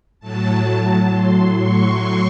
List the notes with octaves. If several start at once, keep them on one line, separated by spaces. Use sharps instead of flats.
A2 F#3 A5
A5
A2 F#3 C6
C#6